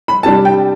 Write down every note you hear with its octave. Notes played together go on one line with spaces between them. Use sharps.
B5
C3 G3 D4 A5
G5